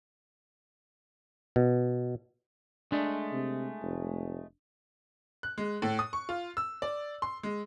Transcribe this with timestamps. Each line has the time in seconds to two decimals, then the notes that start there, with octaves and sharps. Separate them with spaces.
1.56 B2
2.92 G#3 A3 D4
3.32 C3
3.83 F1
5.43 F#6
5.58 G#3
5.82 A2
5.99 D#6
6.13 C#6
6.29 F4
6.57 E6
6.82 D5
7.22 C6
7.43 G#3